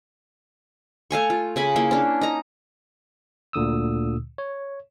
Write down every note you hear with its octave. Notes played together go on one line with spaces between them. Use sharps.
A3 F5 G#5 C#6
F4
C#3 G#5 B5
A#3 E4
C#4 D4
D#4 A#5
D2 A#2 D3 D#6 E6
C#5